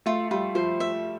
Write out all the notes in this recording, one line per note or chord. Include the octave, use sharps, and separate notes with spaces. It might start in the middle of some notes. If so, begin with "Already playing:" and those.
A3 F4
G3 F4
F3 C5
E5